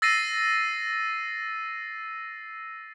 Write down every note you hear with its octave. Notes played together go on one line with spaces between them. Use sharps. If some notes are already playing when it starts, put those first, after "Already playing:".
E6 A6 A#6 C7 D#7